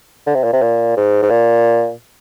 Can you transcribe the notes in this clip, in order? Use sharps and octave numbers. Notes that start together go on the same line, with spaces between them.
D3
C3
A#2
C3
A#2
G#2
G#2
A#2